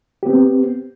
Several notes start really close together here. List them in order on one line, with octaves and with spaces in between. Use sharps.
G4 B3 C4